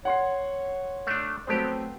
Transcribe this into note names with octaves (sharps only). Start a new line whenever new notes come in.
C#5 F#5 C6 C7
A3 D4
F#3 A3 B3 C4 G4 C5